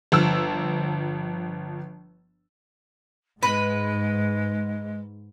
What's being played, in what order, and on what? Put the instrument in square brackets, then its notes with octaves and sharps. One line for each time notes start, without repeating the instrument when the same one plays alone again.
[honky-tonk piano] G1 F3 E6
[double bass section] G#2 [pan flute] G#3 [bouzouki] B4